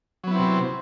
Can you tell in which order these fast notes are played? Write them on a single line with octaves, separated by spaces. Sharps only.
F#3 B3 E4 C4 C3